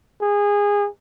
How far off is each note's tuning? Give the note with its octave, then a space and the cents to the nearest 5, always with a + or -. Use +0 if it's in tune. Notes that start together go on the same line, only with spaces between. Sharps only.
G#4 -20